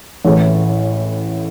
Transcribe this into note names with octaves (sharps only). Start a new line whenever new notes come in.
A1 A2 E3